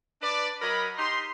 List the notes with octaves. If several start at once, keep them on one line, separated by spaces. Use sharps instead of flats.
D4 B4 D5
F#3 A#4 D#5 B5
D#4 G4 C6